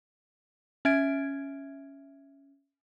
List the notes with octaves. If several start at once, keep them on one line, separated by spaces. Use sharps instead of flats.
C#4 E5 G#6 D7